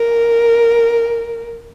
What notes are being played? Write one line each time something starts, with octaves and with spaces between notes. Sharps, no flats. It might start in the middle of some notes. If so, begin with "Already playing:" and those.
Already playing: A#4